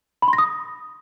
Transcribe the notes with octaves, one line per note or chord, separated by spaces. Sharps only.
B5
C6
A#6
D#6